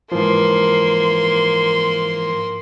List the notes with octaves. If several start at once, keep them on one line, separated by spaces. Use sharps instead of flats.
G#2 E3 F3 A#3 C6